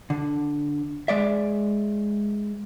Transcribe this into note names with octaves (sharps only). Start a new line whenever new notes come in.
D3
G#3 D5 E5